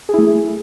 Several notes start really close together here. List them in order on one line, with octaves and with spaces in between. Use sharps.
G#4 E4 A3